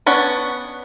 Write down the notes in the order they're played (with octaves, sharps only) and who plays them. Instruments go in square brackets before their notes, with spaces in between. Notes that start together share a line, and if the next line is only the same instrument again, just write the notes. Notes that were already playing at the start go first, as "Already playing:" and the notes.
[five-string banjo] B3 C#4 D4 C#5 F#5